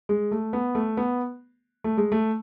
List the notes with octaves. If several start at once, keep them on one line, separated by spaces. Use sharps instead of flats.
G#3
A3
B3
A3
B3
A3
G#3
A3